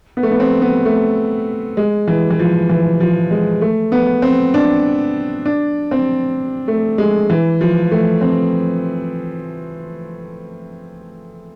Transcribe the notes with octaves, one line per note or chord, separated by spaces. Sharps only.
B3
A3
B3
C4
B3
A3
G#3
E3
E3
F3
E3
F3
G#3
A3
B3
C4
D4
D4
C4
A3
G#3
E3
F3
A3
C4